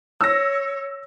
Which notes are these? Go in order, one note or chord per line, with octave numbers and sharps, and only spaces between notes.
C#5 E6 A#6